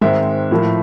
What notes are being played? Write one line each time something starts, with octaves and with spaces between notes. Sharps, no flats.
G#2 D#3 G#3 C4 E5
A2 F3 A#3